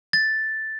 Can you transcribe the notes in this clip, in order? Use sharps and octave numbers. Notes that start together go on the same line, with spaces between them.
A6